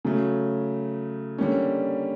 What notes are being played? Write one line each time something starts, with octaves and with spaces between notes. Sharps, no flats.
C#3 F#3 A3
D3 G3 A#3 C#4